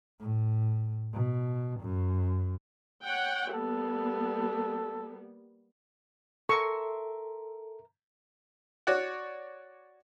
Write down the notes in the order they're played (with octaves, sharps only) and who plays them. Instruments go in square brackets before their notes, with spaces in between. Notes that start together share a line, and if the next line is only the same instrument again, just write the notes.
[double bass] A2
B2
F#2
[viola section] C#5 F#5 G5
[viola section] G3 A#3 B3 [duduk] A4
[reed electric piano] A4 [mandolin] A#4 E5 C6 [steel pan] C#6
[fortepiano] F#4 C#5 D5 F#5